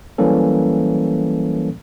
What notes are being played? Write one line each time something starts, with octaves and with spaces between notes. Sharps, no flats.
E3 F#3 G3 A#3 C#4 A4